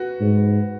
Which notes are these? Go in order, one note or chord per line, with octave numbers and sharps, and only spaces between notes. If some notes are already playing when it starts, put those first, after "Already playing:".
Already playing: F#4 B4
G#2